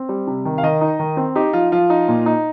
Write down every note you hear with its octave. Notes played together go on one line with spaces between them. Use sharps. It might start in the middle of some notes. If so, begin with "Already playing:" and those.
Already playing: C4
G3
C3
D#3
F5
D#3 D#5
D#4
D#3
C4
D#4 G4
F3 F4
F3 F4
D#4
A#2
D#4